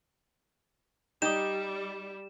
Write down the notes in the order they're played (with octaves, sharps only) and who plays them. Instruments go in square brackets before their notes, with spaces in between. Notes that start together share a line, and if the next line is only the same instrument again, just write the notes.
[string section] G3 [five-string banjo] D#4 [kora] G4 D#5 [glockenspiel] E7